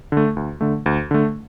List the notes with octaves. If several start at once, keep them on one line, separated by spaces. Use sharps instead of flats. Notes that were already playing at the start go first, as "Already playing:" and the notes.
D3 A3
D2
D3 A3
D2
D3 A3